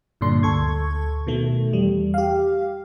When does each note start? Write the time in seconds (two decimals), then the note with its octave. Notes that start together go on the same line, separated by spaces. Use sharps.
0.21 G2 A#2 D3 D4 C6
0.43 D2 A4 C#6 G#6
1.27 B2 D#3 A3
1.72 E2 G3
2.14 G4 F5